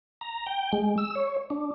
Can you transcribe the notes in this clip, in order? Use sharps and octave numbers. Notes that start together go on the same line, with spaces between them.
A#5
G5
G#3
E6
C#5
D4